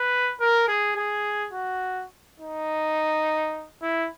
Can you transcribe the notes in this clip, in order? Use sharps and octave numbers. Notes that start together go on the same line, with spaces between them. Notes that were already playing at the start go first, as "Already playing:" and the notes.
Already playing: B4
A#4
G#4
G#4
F#4
D#4
E4